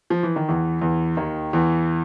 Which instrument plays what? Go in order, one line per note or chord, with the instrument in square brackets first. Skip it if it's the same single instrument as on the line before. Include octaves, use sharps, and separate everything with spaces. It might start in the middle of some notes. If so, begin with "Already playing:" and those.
[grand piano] F3
E3
D#3
E2 E3
E2 E3
D#2 D#3
E2 E3